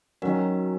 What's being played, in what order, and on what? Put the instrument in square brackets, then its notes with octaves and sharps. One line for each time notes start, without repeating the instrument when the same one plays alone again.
[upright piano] D#3 F#3 C#4 [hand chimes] F#4 A#4